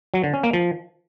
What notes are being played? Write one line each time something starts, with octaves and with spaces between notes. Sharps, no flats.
F#3
D3
C#4
A#3
F3